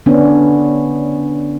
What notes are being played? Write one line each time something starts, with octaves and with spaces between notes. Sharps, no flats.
D3 B3 C#4 D4